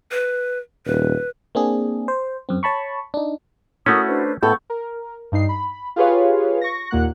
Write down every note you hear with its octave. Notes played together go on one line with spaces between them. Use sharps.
B4
D#1 B4
A#3 C4 D4 G#4
C5
F#2 C4
C#5 A5 B5 C#6
D4 D#4
A3 C#4 E4 F#4 A#4 D6 D#6
D4 B4 C5
A2 B3 A4 C#6 G6
A#4
G2 D#4 C7
B5
F4 G4 G#4 B4 C#5 F5
C#6 A#6
D#2 A#2 A#3 F#5 F#6